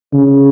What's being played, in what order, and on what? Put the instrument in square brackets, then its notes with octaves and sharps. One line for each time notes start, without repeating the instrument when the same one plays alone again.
[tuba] C#3